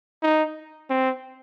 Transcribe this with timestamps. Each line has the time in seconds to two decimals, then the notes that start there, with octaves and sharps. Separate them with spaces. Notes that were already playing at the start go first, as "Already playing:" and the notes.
0.23 D#4
0.90 C4